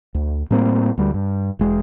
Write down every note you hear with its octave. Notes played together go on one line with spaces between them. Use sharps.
D2
A2 G3 A#3 C4
D2 G3
G2
E1 G#3